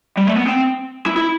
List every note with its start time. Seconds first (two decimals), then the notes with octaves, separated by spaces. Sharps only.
0.17 G3
0.27 A3
0.37 B3
0.47 C4
1.06 E4
1.17 E4